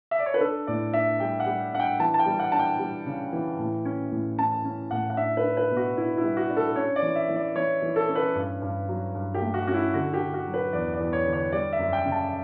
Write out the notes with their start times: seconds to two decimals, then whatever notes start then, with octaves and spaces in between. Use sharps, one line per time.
0.11 E5
0.19 D5
0.26 C#5
0.34 B4
0.41 D4 A4
0.67 A2 D5
0.93 D4 E5
1.20 G3 G5
1.40 F#5
1.46 G3
1.73 D4 F#5
1.80 G5
2.00 E3 A5
2.14 A5
2.19 G5
2.26 G3
2.39 F#5
2.52 D4 A5
2.59 G5
2.79 G3
3.06 C#3
3.33 E3
3.59 A2
3.85 C#4
4.12 A2
4.38 C#4 A5
4.65 C#4
4.91 A2 F#5
5.10 F#5
5.17 D4 E5
5.37 B4
5.43 D4
5.57 B4
5.70 B2
5.77 F#4
5.96 D4 E4
6.17 E4
6.24 G3
6.37 F#4
6.50 D4
6.57 A4
6.76 C#4 C#5
6.96 D5
7.02 E3
7.16 E5
7.29 E3
7.36 D5
7.55 E3 C#5
7.82 E3
7.96 A4
8.09 C#4
8.15 B4
8.35 G2
8.62 G2
8.89 F#3
9.15 G2
9.34 G4
9.41 A3
9.54 F#4
9.67 C#4 F#4
9.74 E4
9.94 D3 F#4
10.13 G4
10.20 D3
10.34 F#4
10.47 F#3
10.54 B4
10.73 E2 D5
10.94 D5
11.00 E2
11.13 C#5
11.26 D3
11.33 C#5
11.52 G3 D5
11.73 E5
11.79 F#2
11.93 G5
12.06 C#3
12.12 A5